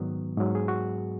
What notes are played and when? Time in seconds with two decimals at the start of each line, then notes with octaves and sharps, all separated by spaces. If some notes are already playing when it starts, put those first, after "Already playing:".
Already playing: G#2 D#3 F#3 B3
0.37 G#2 F#3
0.55 G#4
0.68 F#4